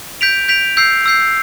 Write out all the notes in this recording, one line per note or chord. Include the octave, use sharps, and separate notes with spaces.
G6 B6 D7 F7
G6 B6 D7 F7
E6 G6 C7
E6 G6 C7